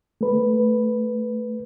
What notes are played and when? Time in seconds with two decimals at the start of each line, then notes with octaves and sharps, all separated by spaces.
0.21 A3 B4